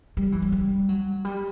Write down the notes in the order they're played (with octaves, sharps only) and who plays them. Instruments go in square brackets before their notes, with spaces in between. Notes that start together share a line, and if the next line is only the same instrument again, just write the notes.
[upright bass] G3
E3
F#3
G3
F#3
G3